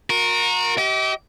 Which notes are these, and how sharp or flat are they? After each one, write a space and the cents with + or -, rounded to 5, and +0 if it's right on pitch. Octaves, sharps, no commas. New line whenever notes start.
F#4 -35 A#4 +0
G4 -30 D#5 +40